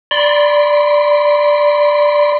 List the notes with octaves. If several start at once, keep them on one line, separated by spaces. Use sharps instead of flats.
D5 B5 C6